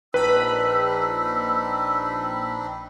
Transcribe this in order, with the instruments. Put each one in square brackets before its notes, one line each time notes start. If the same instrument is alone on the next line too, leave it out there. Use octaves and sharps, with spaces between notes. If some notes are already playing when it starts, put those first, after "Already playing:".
[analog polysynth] A#1 B5 [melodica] C4 D4 D#4 [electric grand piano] B4 [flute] E6